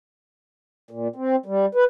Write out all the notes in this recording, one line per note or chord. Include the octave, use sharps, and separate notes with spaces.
A#2
C4
G3
B4